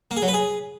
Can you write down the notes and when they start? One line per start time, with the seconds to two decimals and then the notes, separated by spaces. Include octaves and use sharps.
0.11 A#3
0.17 G#4
0.22 F#3
0.28 B4
0.34 G#4